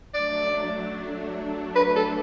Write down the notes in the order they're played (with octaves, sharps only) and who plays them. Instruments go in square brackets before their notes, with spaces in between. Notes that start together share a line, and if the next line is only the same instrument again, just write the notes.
[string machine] F#3 A3 D4 [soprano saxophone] D5
[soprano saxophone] B4
A4